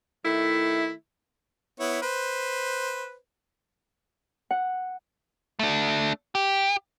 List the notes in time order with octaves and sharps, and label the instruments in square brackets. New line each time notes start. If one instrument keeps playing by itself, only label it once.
[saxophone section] D#3 A3 E4
[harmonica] B3 E4 C#5
B4 C5
[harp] F#5
[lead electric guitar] A3 D4
G4